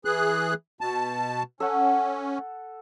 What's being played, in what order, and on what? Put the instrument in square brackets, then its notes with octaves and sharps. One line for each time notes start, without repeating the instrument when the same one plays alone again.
[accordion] E3 G#4 F#6
B2 A5
[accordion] C#4 [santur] A4 F#5